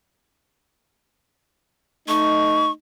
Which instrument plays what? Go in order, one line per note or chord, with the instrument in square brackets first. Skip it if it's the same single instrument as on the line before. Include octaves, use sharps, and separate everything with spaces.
[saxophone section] A3 D#4 [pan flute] C#6